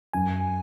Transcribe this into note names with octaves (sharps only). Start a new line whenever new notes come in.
F#2 G#5